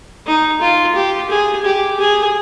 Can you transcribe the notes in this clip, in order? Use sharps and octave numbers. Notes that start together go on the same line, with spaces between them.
D#4
F4
G4
G#4
G4
G#4